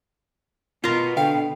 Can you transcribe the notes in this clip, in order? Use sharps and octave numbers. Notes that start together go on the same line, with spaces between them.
B2 F4 A#4
D3 F5 G5